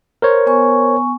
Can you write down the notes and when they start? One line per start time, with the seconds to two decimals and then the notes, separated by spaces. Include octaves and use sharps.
0.22 A#4 C5 C#5
0.46 B3 G#5 C#6